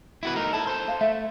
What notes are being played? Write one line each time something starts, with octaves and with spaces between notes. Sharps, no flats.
E4 F#4 B4
A3 D#4 A#4
E4 A4 A5
A4 C5
F5
A3 E5